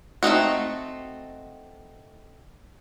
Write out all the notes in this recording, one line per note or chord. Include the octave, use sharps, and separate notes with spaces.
A3 C4 D#4 F#4